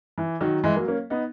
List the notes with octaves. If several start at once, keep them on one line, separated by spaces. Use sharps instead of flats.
E3
D#3 F#3
E3 G#3
F#3 A#3
A#3 C#4
B3 D#4